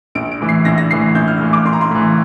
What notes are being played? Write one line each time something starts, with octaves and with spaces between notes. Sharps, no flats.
A#1 D7
D7
A2 E3
C7
A#1 A#6
A#6
A2 E3 C7
A#1 G6
F6
A2 E3
D6
A#1 C6
A#5
C6
A2 E3